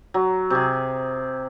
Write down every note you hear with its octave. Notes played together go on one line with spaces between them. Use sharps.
F#3
C3 G#4